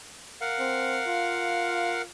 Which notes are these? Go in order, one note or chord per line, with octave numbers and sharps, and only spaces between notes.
A#4 F5 F#5
C4
F4